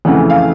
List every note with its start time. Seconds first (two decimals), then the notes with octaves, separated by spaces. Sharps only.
0.05 F2 C#3 E3 A3 F#5
0.30 F5